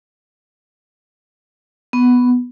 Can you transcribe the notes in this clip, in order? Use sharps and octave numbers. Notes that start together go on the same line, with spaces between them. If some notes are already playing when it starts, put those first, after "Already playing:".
B3